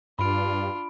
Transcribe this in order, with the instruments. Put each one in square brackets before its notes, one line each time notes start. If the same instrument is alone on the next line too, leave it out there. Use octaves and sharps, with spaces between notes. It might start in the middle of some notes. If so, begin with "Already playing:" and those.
[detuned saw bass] G2 [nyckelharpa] D4 F4 [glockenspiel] B5 D7